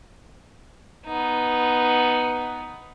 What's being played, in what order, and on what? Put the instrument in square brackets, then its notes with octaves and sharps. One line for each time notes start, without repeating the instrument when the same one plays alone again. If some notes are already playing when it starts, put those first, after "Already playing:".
[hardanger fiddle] B3 D#4